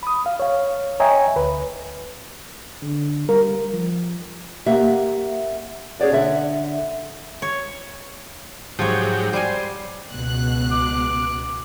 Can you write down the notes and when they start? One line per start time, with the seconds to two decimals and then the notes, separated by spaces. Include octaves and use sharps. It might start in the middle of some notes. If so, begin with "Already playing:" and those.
0.03 B5 D#6
0.26 F5
0.40 C#5 F5
1.00 C#5 D#5 E5 G5 G#5 A#5
1.36 D2 B4
2.82 D3
3.29 G3 A#4
3.72 F3
4.66 A#3 G4 E5 F#5
6.00 C#4 G#4 C#5 D5 F#5
6.12 D3 E5 F#5
7.42 C#5
8.79 G#2 F3 F#3 G4 C#5
9.33 G3 C5 G#5
10.12 C#2 B2 F#6
10.71 D6